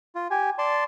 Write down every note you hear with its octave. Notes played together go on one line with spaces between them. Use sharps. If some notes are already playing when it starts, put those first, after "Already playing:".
F4
G4 G#5
D5 A5 C6